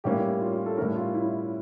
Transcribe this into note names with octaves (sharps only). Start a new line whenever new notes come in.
A2 G3 A#3 C#4 G4
F4
F4
A4
A2 G3 C#4 A#4
F4
E4